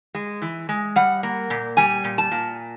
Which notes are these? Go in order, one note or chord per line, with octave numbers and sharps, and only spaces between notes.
G#3
E3
G#3
G3 F#5
A#3
A#2
G3 G#5
A#2
A5
A#2